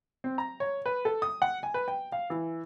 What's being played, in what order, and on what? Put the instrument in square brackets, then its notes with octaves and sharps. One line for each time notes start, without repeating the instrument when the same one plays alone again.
[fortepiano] C4
A#5
C#5
B4
A4
D#6
F#5
G#5
B4
G5
F5
E3